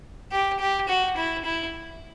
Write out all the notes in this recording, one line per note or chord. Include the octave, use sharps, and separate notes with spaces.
G4
G4
F#4
E4
E4